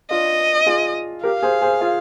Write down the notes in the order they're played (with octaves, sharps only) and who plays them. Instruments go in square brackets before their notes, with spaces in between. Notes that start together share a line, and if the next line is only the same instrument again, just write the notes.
[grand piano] D4 F4 [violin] D#5
[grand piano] F4 G#4
[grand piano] G4 A#4 [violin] F5
[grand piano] G#4 C5
G#4 C5
F4 G#4